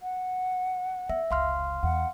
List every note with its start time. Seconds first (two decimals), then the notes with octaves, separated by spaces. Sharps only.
0.01 F#5
1.09 B3 E5
1.31 F1 C#2 F5 C6 F6
1.83 E2 F#5